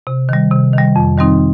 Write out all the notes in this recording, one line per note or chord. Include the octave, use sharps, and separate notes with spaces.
C3
D#3 G3
C3
D#3 G3
F2
D#3 G3 C4 D#4